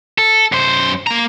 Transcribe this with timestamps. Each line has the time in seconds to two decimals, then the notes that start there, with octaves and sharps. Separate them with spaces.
0.18 A4
0.52 F#2 C5
1.07 A#3 A#5